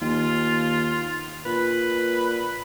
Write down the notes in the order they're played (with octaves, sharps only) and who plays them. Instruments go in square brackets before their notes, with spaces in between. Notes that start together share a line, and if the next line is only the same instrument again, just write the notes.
[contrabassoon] D#2 [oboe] F4
[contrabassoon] A#2 [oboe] B4